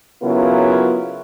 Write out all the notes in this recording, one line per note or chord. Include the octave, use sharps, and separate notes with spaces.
C#3 F#3 B3 E4 F4 A#4